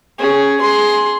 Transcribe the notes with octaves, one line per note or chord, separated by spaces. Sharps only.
C#4 G#4
G#4 C6